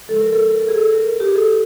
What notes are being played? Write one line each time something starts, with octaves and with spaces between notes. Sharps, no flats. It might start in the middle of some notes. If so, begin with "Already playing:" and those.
C#3 F3 G#3 A4
A#4
A4
A#4
A4
G#4
A4
A#4
G4
G#4
A4